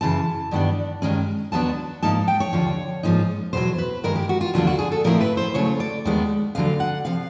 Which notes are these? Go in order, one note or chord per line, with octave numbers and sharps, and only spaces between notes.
F#2 C#3 E3 A5
G2 D#3 G3 B3 D4
G2 D#3 G#3 C#4
D#2 D#3 F#3 B3 D4 A5
G#2 F3 A#3 D#4 A5
G5
C#5
D#2 D3 F3
G#2 F3 A#3 D#4
E2 B2 F#3 C5
B4
G2 D#3 G#3 A#4
G4
F#4
F4
D#2 D3 F#3 A#3 D4 F4
F#4
G#4
A4
A2 F3 A3 C4 E4 A#4
B4
C5
C#3 F#3 A3 C#5
D5
D#2 D#3 G#3 B3
D2 D3 F#3 F5
F#5
C3 F3 F5